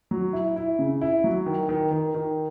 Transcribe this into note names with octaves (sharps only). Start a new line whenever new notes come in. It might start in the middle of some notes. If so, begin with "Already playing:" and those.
F#3
E4
E4
C#3
E4
F#3
D#3
D#3
D#3
D#3